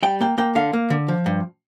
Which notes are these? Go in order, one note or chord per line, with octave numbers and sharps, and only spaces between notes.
G3 G5
A#3 G5
A#3 G5
D3 F5
A#3
D3
F3
G2